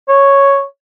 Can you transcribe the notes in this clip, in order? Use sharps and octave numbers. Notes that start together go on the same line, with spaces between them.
C#5